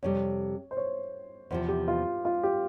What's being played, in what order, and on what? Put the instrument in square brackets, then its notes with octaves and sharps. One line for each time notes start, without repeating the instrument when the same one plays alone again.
[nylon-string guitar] F2 C3 G3 [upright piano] C#5
[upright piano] C5
C#5
[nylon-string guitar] E2 C3 F3 [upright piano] C5
[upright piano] G4
F4
F4
G4